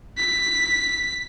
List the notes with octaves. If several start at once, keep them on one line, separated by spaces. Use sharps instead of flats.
B6